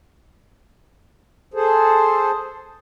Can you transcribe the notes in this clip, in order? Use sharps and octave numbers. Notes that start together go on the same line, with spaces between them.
G#4 A4 C5